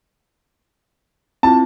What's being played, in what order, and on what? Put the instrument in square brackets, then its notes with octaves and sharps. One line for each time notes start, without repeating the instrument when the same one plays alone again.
[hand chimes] C4 E4 F4 [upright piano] A5